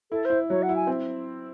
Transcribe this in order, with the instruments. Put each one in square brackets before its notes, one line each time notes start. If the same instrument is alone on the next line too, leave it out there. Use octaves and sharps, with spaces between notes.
[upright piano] E4 [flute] A4
[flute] C5
[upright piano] E4
[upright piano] F#3 [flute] C#5
[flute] F#5
[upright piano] E4
[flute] G#5
[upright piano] C4